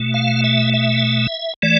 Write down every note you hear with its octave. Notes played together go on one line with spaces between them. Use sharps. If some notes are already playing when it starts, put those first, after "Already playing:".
Already playing: B2 A3
F5
E5
E5
E3 A3 D5